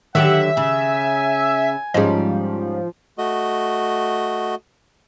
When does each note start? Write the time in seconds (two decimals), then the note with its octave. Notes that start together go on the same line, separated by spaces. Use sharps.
0.15 D3 D#3 F#3 G4 E5 F#5
0.57 C#3 G#5
1.94 G#2 F3 G3 C#4 G#4 D#5
3.18 A3 F#4 D#5